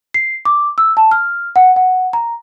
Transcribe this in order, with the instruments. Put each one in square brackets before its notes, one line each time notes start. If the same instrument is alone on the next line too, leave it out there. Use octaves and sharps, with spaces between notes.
[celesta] C7
D6
E6
A5
F6
F#5
F#5
A#5